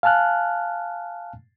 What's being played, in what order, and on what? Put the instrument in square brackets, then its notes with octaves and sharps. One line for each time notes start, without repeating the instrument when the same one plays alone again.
[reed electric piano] F5 G#5 A5 F6 F#6